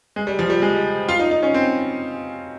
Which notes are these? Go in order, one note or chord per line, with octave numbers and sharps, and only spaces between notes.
G#3
G3
F3
G3
G#3
F4
D#4
D#4
C#4
C4